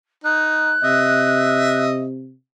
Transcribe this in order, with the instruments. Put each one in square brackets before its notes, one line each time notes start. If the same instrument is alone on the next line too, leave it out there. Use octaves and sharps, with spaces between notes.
[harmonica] D#4 [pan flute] F#6
[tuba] C3 [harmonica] D#5 E5